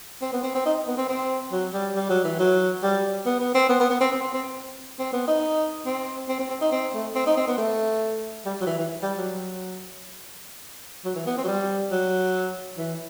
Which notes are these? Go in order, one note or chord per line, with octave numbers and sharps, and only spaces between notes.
C4
B3
C4
C4
D#4
B3
C4
C4
F#3
G3
G3
F#3
E3
F#3
G3
B3
B3
C4
B3
B3
B3
C4
C4
C4
C4
C4
B3
D#4
C4
C4
C4
C4
D#4
C4
A3
C4
D#4
C4
B3
A3
G3
F#3
E3
E3
G3
F#3
F#3
E3
B3
C4
F#3
G3
F#3
E3